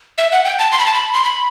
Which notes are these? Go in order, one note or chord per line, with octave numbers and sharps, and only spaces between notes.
E5
F#5
G5
A5
C6
B5
A5
B5
C6
B5